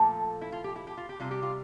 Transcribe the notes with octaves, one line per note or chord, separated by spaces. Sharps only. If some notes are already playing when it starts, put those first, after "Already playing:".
Already playing: A#2 F3 A3 A4
E4
F4
G4
E4
G4
F4
G4
C3 G3 F4
G4
F4